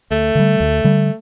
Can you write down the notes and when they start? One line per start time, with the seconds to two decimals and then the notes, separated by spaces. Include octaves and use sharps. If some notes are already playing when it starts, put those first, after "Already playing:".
0.11 D2 A3
0.35 D3 G3
0.60 D2
0.84 D3 G3